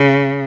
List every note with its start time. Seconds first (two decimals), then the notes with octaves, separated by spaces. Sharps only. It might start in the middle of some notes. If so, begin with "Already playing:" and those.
Already playing: C#3